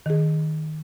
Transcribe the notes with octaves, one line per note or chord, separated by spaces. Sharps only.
D#3 G#4